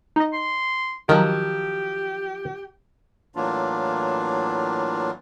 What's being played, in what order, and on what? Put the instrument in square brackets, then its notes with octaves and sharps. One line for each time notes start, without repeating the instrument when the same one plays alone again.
[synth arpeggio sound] D#4 D#5
[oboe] C6
[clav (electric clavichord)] D#3 [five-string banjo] F3 F#3 [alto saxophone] G4
[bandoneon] A2 E3 F#3 A#3 D4 F4